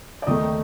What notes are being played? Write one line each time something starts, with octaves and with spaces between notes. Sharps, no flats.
D5
D#2 D#3 A3 D#4 D#5